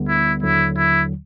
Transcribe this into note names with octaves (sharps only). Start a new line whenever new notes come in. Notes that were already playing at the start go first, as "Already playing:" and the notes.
Already playing: D2 D3 G3 B3
E4
D#2 D3 F#3 E4
E4